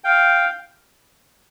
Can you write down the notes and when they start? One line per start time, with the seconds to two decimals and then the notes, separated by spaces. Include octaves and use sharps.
0.04 F5 G5